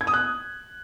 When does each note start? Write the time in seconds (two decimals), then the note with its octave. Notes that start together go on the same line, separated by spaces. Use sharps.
0.01 G#6
0.07 D#6
0.14 F#6